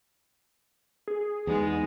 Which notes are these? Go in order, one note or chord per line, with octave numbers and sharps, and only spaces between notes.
G#4
E2 G#3 B3 D#4